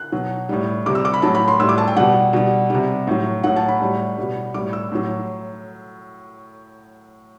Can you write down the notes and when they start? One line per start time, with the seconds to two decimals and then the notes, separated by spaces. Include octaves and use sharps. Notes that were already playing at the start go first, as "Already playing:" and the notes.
Already playing: F#6
0.12 B2 F#3
0.49 A2 G3
0.86 C3 G3 D6
0.95 E6
1.05 D6
1.14 B5
1.22 A2 F#3 A5
1.35 B5
1.48 C6
1.60 A2 G3 E6
1.69 D6
1.78 A5
1.88 G5
1.96 B2 G3 F#5
2.33 B2 G3
2.70 C3 G3
3.07 A2 F#3
3.43 A2 F#3 F#5
3.56 A5
3.68 B5
3.80 A2 G3
4.18 B2 G3
4.54 A2 G3 D6
4.73 E6
4.92 A2 F#3